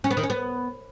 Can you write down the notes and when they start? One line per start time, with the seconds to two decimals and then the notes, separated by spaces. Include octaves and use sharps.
0.04 C#4
0.11 B3
0.17 D#3
0.23 C#4
0.30 B3